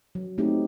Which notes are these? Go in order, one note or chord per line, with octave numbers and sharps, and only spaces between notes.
F#3
A3 C4 D#4 G4